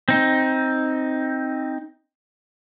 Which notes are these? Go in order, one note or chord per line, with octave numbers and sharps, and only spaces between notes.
C4 D#4